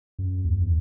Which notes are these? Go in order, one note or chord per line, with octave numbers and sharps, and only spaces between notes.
F#2
D#2
E2